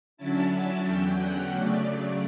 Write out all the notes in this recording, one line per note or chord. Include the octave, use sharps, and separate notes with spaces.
D3 F#3 C#4 E4 A5
E2 D3 F#3 C#4 G5
F#5
C#3 F#3 A3 D5
D5